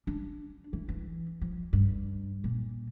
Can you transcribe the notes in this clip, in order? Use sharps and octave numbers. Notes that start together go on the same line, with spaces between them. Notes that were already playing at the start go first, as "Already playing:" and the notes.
D4
E3
E3
F3
G2
A#2